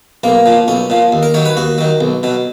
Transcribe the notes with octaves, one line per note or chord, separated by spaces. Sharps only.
B1 A#3
A#2 F3
B1 C#4
A#2 F3
D#2
A#4
D#3 F#3 C#5
B4
D#2 F#4
D#3 F#3
B1
B2 F#3